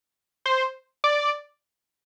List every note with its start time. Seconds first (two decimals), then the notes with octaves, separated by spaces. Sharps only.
0.46 C5
1.04 D5